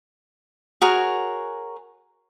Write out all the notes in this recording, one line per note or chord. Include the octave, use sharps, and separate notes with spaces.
F#4 G#4 A#4 C#5